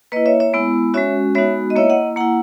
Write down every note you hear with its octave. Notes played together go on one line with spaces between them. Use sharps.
A#3 E4 B4 D#5
C#5 E5
C#5 E5
G#3 B3 E4
G#3 C#4 F#4 C#5 E5
G#3 B3 D#4 F#4 C#5 E5
D#5
A#3 E4 C#5 E5
D#5 F#5
A#3 E4 F#5 A#5